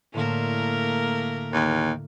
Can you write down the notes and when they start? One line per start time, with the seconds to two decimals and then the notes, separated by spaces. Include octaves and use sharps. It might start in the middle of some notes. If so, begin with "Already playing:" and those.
0.14 A2 D3 A3 A#3 A#4 C6
1.53 D#2